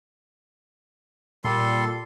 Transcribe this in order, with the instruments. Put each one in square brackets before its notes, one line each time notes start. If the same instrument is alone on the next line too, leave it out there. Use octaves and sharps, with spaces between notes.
[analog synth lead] A#2 [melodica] G3 A4 C6